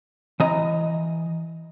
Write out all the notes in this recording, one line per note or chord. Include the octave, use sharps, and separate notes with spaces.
E3 D#5 A#5